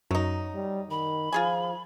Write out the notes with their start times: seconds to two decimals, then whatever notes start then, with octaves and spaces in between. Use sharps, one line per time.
0.11 F#2 F#3 D#4
0.55 G3
0.90 D#3 B5
1.32 F3 F4 G#4 G#5